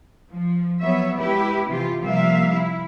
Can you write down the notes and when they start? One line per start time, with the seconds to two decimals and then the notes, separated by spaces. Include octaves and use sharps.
0.31 F3
0.80 F#3 B3 C#5 E5
1.17 G#3 E4 G4 B4
1.68 C3 E3 F4 G4
2.02 C3 F3 G3 A#3 E5 F5
2.51 E4